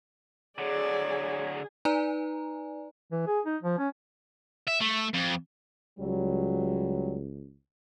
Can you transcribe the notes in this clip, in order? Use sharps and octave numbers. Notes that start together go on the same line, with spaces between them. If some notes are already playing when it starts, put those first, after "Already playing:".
D3 F#3 G#4 C#5 D5
D#4 B4 D5 G#5 A#5
E3
G#4
D#4
F3
C#4
E5
A3
F2
C#2 F#3 G3